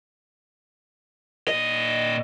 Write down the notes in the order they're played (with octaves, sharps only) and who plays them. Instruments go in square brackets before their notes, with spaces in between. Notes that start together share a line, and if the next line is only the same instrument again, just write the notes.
[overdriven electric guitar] A#2 D#5